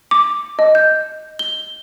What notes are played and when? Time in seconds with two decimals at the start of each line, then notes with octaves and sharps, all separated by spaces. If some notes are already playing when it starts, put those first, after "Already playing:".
0.11 D6
0.59 D#5
0.75 G6
1.39 G7